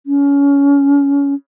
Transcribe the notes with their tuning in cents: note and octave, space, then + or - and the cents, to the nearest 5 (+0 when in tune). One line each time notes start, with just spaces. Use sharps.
C#4 +25